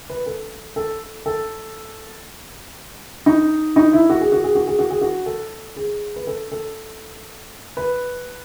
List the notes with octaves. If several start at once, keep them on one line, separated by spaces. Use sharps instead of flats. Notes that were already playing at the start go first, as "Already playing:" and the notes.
B4
A4
A4
A4
D#4
D#4
E4
F#4
G#4
F#4
G#4
F#4
G#4
F#4
G#4
F#4
A4
G#4
B4
A4
A4
B4